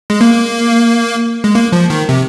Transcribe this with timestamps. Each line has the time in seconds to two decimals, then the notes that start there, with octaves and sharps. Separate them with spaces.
0.10 G#3
0.21 A#3
1.44 G#3
1.55 A#3
1.72 F3
1.90 D#3
2.09 C3